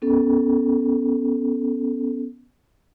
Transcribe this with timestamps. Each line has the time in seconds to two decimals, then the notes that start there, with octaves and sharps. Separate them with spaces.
0.02 B3 C#4 A4